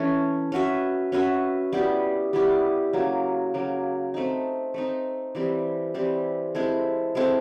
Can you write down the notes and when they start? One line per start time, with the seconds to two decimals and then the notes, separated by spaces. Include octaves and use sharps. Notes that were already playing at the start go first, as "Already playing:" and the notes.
Already playing: E3 A3 C#4
0.52 C#4 F#4 B4 E5
1.12 C#4 F#4 B4 E5
1.73 G3 B3 E4 G4
2.33 G3 B3 E4 G4
2.93 C#3 F#3 A#3
3.54 C#3 F#3 A#3
4.14 A3 C4 D#4
4.74 A3 C4 D#4
5.35 E3 G3 C4
5.94 E3 G3 C4
6.55 G#3 C4 E4 A4
7.15 G#3 C4 E4 A4